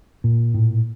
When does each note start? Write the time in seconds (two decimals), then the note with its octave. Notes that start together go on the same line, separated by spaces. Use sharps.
0.24 A#2
0.54 A2